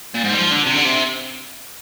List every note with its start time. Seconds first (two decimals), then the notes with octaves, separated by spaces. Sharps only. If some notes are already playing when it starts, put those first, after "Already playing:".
0.15 A#2
0.24 G#2
0.33 G3
0.39 F3
0.52 D3
0.66 C3
0.76 D3
0.85 C3